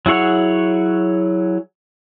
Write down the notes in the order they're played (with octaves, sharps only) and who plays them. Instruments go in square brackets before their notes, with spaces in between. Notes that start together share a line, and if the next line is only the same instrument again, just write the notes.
[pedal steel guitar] F#3 E4 G#4 C#5 F#5